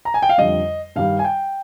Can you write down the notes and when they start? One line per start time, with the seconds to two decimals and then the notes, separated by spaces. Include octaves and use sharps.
0.05 A#5
0.14 G#5
0.22 G5
0.29 F5
0.38 F2 D3 G3 D#5
0.95 G2 D#3 G3 F5
1.19 G#5
1.24 G5